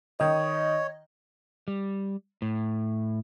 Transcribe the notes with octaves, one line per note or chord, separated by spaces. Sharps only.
D#3 C#5 D#5 D#6
G3
A2